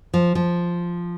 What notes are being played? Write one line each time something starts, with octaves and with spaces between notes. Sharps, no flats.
F3
F3